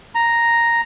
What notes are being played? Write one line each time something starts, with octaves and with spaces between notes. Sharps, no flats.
A#5